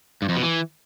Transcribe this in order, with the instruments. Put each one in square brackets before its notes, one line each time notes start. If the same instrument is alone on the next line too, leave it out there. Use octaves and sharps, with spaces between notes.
[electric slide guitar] G2
F2
B2
E3